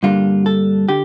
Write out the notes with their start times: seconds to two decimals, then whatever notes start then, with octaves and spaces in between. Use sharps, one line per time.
0.03 G2 D3 G3 A#3 D4 F4
0.46 A4
0.89 D3 G4